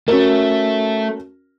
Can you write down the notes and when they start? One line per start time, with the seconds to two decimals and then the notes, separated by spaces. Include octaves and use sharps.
0.08 A3 C#4 F#4 A#4